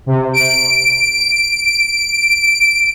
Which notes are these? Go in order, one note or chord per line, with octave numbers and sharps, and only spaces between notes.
C3
D7